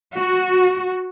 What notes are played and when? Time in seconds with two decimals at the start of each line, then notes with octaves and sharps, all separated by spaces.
0.16 F#4